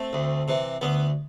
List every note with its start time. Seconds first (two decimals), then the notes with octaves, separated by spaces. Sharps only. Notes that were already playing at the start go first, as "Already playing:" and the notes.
Already playing: A3 C4
0.13 D2
0.48 C3 E3
0.81 D2 B3